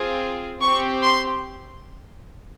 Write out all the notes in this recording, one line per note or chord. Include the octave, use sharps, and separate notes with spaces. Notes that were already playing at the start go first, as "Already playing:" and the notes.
Already playing: C4 F4 G#4
C4 G4 C#6
C6